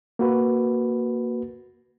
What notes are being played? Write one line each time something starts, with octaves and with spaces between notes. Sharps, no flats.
A#3 F#4 B4